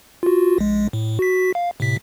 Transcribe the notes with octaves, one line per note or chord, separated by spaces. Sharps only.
F4 F#4
A#1 G#3
A2
F#4 B6
F5
A2 C3 B6